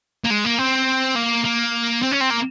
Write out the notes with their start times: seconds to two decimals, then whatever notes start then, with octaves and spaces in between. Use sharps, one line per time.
0.24 A#3
0.30 G#3
0.45 A#3
0.59 C4
1.16 A#3
1.45 A#3
2.03 C4
2.12 C#4
2.21 C4
2.31 A#3